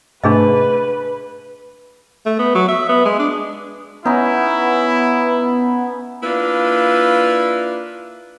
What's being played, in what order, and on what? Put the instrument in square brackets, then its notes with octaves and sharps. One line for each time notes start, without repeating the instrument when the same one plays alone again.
[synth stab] G#2 C3 A3 [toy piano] D4 G#4 D#5 [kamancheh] B4
[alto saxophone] A3
B3
F#3
E5
B3
G#3
D4
[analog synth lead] B3 [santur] C#4 D#4 [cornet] E4
[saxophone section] A#3 D4 E4 F4 B4